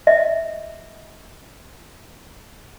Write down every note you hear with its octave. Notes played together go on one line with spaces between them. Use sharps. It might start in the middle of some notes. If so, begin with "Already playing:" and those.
D#5 E5